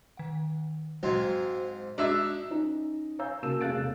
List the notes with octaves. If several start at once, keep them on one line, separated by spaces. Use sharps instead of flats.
D#3 F#5
G#2 F#3 C4 C5 F5 C6 G#6
G#3 D4 D#4 F#4 D#5 E5 E6
C#4 D#4
C#5 F5 G#5 A#5 E6 G6
C#3 A#3 F#4 A5 E6 E7
F1 G#4 F5 F#6 A6 D7
E1